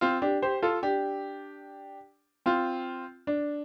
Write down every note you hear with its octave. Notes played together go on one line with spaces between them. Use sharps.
C4 F4
D4 G4
G4 C5
F4 A4
D4 G4
C4 F4
D4